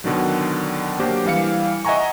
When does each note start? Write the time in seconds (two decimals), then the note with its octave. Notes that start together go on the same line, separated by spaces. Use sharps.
0.04 B2 D3 D#3 F#3
0.99 F#3 A#3 D4 G4 A#4 C5
1.25 E3 G3 F5 C#7
1.85 D#5 E5 F#5 G#5 A#5 C#6